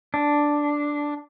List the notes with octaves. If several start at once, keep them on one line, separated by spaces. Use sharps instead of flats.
D4